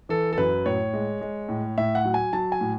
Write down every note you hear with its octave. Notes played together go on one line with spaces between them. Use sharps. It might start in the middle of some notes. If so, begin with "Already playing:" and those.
E3 A4
A4
F#2 B4
A2 C#5
G#3
G#3
A2
A2 E5
F#5
F#3
G#5
F#3 A5
G#5
A2